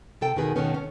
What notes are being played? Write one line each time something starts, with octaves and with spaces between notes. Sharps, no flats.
C3 A4 G5
E2 B2 D#3 G#4 B4
B2 D#3 A3 B3 C#4
C#4